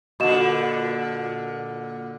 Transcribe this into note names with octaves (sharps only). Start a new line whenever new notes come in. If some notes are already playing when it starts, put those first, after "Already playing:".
A#2 D3 F#4 D#5 E7